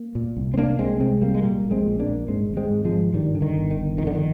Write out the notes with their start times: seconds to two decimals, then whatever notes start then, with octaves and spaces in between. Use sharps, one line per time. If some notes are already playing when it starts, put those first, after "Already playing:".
Already playing: A#3
0.15 A#2
0.37 C2
0.54 C4
0.57 C3 A#3 D4
0.79 C2 G#3 C4
1.00 C3 G#3 C4
1.22 C2 G3 A#3
1.35 G#3
1.42 A#2 G3 A#3
1.65 A#1
1.71 G#3 C4
1.86 A#2
2.00 A#3 D4
2.07 A#1
2.28 G#2 G#3 C4
2.50 G#1
2.57 G#3 C4
2.71 G#2
2.85 F3 G#3
2.92 G#1
3.13 G2 D#3 G3
3.35 D3
3.42 D#3
3.56 G1
3.71 D#3
3.77 G1
3.98 F2 D#3
4.07 D3
4.15 D#3